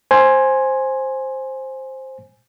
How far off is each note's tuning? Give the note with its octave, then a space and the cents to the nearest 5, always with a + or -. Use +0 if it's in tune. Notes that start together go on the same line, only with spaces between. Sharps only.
C5 +10 G#5 +0